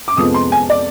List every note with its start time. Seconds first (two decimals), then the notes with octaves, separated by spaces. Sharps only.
0.08 D6
0.17 F2 C3 F3 G#3 B3 D#6
0.34 C6
0.52 G#5
0.70 D5